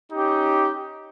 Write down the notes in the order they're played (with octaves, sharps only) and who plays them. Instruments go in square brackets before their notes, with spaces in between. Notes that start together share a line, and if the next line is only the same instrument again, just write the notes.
[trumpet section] C#4 D#4 G4